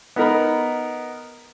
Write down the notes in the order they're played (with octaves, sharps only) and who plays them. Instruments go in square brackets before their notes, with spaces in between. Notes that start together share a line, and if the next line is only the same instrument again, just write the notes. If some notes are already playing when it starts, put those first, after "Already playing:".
[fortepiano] B3 D#4 A#4 B5